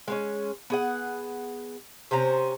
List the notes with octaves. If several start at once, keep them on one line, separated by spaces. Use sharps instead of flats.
G#3 A#3 C#4
B3 G#4 F#5
C3 C#4 C5 A#5